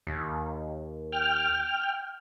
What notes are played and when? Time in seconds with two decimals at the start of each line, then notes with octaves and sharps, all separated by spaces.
0.07 D#2
1.12 G5 F6